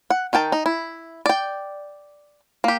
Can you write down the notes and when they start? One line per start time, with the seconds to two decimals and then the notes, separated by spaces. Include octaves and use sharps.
0.10 F#5
0.33 D#3 A#4 G5 A5
0.52 D#4
0.66 E4
1.26 D5 G5
2.64 A#3 G4